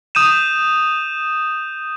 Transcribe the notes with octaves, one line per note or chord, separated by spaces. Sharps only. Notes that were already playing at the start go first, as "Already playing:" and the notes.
D#6 G6 D#7 E7